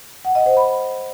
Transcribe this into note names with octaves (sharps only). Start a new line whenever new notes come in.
F#5
D#5
C5
B5